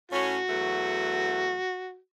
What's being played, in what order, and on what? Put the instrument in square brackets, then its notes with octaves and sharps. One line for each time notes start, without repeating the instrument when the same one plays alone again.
[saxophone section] A2 C#4 [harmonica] F#4
[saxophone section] E2 F#3 A3